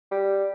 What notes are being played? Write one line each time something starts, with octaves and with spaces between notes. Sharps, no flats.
G3